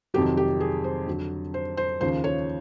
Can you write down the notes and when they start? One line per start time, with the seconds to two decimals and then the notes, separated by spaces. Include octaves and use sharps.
0.14 F2 C3 D#3 F#3 G4
0.37 G4
0.60 G#4
0.84 C5
1.07 F2 D3 F#3
1.54 C5
1.77 C5
2.01 D#2 C#3 F3 C5
2.24 C#5